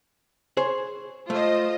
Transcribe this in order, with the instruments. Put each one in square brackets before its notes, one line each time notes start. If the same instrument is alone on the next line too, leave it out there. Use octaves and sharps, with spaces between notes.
[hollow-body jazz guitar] G#4 C5 C#5
[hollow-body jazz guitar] A3 [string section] F4 C5 D#5